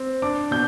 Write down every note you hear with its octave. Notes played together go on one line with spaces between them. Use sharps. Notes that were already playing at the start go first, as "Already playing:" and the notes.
Already playing: C4
D4 D6
B2 G6